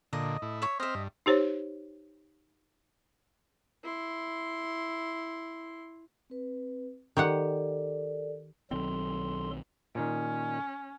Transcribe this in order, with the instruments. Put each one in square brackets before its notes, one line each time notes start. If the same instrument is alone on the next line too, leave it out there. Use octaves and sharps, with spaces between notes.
[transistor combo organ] A#2 D3 [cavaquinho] D#5
[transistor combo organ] A2 E4
[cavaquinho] C#5 E5
[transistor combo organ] C4 C5 F6 [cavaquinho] D#5 E5
[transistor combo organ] G2
[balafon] D#4 G4 C5 C#5
[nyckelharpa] E4 C6
[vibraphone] C4 B4
[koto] D#3 G4 F#5 [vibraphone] A4 A#4 D5
[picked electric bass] B1 D#3 C4 [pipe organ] F#3 A4 C6
[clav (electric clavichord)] A#2 D#3 [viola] C#4